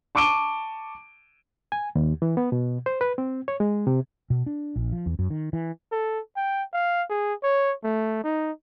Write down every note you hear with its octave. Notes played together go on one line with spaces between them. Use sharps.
A5 C#6 D6 D7 D#7 G7
G#5
D#2
E3
B3
B2
C5
B4
C4
C#5
G#3
C3
B2
D4
A#1
F3
E2
F#2
D#3
E3
A4
G5
F5
G#4
C#5
A3
D#4